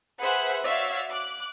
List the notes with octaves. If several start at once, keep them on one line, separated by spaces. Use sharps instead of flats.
G#4 B4 C5 E5 F#5
F#4 C#5 D5 E5 F5
D6 F#6